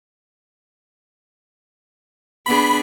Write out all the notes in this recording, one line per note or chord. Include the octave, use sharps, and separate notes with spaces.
B3 D4 G#4 B5